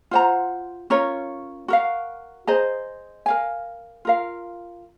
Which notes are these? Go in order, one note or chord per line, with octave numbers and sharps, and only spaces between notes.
F4 C5 F#5 A#5
C#4 F4 A#4 C#5
F#4 A#4 F5
G#4 C5 D#5 A#5
A#4 F5 G#5
F4 A#4 F5